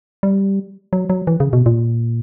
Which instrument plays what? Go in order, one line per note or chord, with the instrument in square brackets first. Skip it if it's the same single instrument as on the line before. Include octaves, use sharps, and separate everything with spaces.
[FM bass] G3
F#3
F#3
E3
C#3
B2
A#2